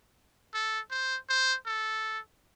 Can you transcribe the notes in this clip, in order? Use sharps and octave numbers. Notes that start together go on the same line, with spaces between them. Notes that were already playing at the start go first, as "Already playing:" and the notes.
A4
C5
C5
A4